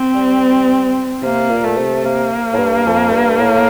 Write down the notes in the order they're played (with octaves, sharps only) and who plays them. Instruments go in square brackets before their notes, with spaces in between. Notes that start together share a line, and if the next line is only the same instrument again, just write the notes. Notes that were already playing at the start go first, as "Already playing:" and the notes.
Already playing: [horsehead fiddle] C4
[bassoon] G3
[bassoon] C3 [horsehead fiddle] A#3
[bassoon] A#2
[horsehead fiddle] A3
[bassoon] C3
[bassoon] C3 [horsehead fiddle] A#3
[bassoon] A2
G2
F2
G2
A2